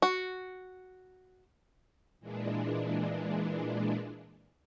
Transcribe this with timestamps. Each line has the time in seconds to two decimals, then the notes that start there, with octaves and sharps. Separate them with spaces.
0.02 F#4
2.20 A#2 E3 G#3 D4